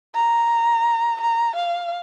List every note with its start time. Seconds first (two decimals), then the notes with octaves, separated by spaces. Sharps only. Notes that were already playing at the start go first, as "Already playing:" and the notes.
0.15 A#5
1.21 A#5
1.56 F5